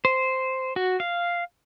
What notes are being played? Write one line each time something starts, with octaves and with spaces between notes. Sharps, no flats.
C5
F#4
F5